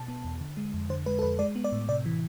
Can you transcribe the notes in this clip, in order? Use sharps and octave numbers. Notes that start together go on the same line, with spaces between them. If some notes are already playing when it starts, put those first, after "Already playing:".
Already playing: B2 A5
B3
E2
D3
G#3
F2
D3 C5
G#3 B4
A4
F2 B4
G#3 D5
B3
D5
A2
C3 D5
E3